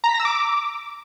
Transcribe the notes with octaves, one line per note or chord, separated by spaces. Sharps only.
A#5
B6
A#6
E6
D6